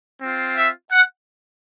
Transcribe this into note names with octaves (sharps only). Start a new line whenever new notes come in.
C4 F4
E5
F#5